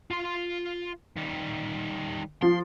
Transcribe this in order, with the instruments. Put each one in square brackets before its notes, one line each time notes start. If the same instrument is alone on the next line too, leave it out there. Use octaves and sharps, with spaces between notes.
[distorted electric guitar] F4 C6
D#3 G3
[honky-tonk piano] F3 [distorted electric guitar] C6